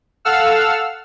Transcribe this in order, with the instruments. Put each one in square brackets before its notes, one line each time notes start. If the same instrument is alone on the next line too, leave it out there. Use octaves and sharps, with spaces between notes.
[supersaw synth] A4 F5 F#5 E6 F6